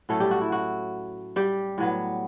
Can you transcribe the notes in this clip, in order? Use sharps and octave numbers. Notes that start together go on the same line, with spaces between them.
A2 F#3 A3 C#4 A4
G3 G4
F#4
E4
F#4
G3 G4
A2 F#3 B3